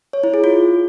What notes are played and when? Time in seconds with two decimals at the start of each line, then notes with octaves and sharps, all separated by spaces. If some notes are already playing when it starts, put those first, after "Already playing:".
0.13 C#5
0.24 E4
0.34 G#4
0.44 F4